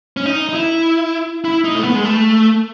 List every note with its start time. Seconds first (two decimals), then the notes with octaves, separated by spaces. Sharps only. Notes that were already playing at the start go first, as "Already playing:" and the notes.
0.17 C#4
0.26 D#4
0.49 D#4
0.55 E4
1.45 E4
1.64 D#4
1.75 A3
1.84 B3
1.95 G#3
2.05 A3